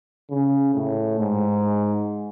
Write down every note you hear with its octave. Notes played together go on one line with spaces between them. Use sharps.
C#3
A2
G#2